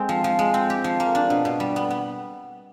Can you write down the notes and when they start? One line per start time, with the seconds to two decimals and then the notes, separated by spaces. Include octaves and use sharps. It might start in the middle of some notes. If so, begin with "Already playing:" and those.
Already playing: G#3 C4
0.09 F3
0.24 F3
0.39 G#3
0.54 C4
0.70 G4
0.84 F3
1.00 A#3
1.15 D4
1.30 B2
1.45 B2
1.60 G3
1.76 B3
1.91 B3